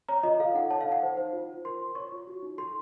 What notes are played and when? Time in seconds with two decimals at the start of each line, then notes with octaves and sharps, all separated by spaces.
0.09 C#5 A#5
0.23 F4 D#5
0.40 A4 F5
0.55 D#4 F#5
0.70 C#5 A5
0.81 F5
0.87 D#4
0.92 F#5
1.03 C5
1.17 C5
1.33 F4
1.48 F4
1.64 A#4 C6
1.80 F4
1.95 C#5 C#6
2.12 F4
2.27 F#4
2.42 D#4
2.58 A4 C6